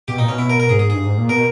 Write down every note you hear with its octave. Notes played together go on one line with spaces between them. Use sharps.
B2 G4
A#2 D#4
B2 C#4
E4
A#4
A#4
G#2 G#4
G#4
G2 G#4
G#2
A#2
B2 A#4